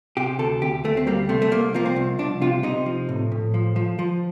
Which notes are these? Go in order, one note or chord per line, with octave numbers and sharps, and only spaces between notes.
C3 G4
D2 A4
D2 G4
D2 A3
C4
G3 A#3
C3 A3
A3
C2 A#3
F3 A#3
C4
C2
C2 D4
C3 F4
C3 D#4
F3
A2
A2
F3
F3
F3